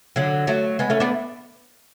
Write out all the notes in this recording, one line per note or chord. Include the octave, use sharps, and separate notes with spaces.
D3 F#3
F#3 A3
G#3 B3
A3 C#4
B3 D4